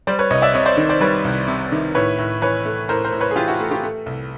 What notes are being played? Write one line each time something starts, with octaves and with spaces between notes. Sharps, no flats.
G3 C5 D5
B4 C#5
C2 C#5 D#5
D5 E5
C3 C#5 D#5
C5 D5
D#3
C5 D5
G3 B4 C#5
C2
C3
D#3
A2 B4 C#5
A2
E3 B4 C#5
A3
A2 A#4 C5
A#4 C5
A2
B4 C#5
G#4
E3 F4 G4
E4 F#4
A3
F4 G4
A3
C2